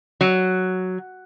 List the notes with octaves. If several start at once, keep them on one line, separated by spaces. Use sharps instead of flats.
F#3